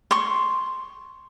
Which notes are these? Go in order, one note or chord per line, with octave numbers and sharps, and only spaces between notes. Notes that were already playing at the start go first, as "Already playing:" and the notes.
C6 C#6